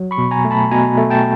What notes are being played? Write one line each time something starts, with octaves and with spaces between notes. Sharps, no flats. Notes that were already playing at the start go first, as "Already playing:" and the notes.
Already playing: F#3
B5 C#6
B2
G#5 A#5
A3
A5 B5
B2 G#5 A#5
A3
G5 A5